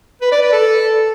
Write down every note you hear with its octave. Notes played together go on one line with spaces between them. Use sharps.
B4
D5
B4
A4